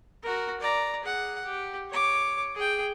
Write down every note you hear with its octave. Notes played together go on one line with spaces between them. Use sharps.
F#4 A#4
D5 A#5
G#4 F#5
G4
C#5 D6
G#4 G5